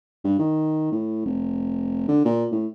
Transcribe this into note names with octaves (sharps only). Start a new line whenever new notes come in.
G2
D#3
A2
F1
D3
A#2
A2